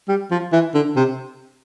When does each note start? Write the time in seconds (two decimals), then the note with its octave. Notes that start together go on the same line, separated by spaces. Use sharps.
0.09 G3
0.31 F3
0.52 E3
0.74 D3
0.96 C3